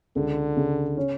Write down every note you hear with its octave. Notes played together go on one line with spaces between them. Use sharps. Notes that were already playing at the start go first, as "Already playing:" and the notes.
C#2 D3
C#3
C#4